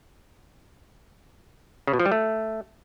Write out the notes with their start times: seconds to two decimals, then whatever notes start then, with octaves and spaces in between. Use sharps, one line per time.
1.87 C#3
1.93 B2
2.00 F3
2.06 G3
2.12 A3